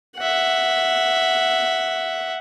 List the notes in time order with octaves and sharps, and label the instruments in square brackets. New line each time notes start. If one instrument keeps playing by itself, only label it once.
[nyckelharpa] E5 F#5